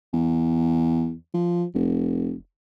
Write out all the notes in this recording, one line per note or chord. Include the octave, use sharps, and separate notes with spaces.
E2
F3
F1